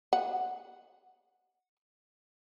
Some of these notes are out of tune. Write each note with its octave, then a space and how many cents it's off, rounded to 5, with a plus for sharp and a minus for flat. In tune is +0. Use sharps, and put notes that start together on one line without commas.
F#5 -15